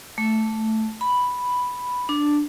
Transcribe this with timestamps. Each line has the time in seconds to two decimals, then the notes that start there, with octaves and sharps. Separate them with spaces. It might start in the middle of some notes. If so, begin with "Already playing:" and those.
0.18 A3
1.01 B5
2.09 D4